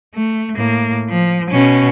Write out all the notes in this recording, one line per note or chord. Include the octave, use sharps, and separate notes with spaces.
A3
A2 A#3
F3
B2 C#4